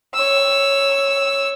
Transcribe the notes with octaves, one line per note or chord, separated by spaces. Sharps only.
C#5 E6